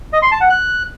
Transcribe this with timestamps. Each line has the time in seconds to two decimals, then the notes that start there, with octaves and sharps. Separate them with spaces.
0.13 D#5
0.22 C6
0.31 A5
0.41 F#5
0.50 F#6